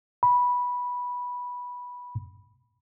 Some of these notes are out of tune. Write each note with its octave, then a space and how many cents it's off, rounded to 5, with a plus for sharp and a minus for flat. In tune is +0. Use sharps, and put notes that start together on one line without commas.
B5 -10